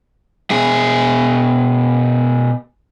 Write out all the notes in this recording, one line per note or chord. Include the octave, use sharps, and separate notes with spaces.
B2 G#4